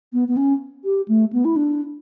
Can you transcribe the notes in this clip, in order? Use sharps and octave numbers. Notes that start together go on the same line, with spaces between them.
B3
B3
C#4
G4
A3
B3
E4
D4